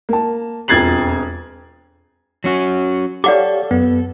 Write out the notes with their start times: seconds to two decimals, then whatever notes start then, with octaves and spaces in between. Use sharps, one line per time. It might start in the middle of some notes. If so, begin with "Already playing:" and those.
0.09 A#3 A5
0.68 E1 F2 G#6 A6 C7 F#7
2.44 F#3 C#4 F#4
3.24 G4 A4 C#5 D5 F5 F#5 D6
3.71 F#2 B3